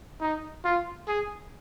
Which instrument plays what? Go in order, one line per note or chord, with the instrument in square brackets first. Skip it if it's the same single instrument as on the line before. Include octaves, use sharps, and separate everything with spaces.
[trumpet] D#4
F4
G#4